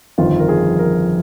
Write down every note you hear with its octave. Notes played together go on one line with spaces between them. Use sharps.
G1 F2 D#3 F4
A#4
G#4
A#4